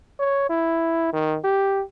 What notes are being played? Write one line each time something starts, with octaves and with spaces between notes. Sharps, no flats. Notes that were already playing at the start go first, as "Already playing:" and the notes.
C#5
E4
D#3
G4